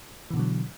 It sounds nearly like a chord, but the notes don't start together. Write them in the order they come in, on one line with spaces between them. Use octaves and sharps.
E3 B2 D3 F#3